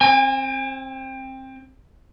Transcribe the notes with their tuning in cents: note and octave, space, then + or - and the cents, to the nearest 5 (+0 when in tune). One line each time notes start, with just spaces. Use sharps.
C4 +20 G#5 -35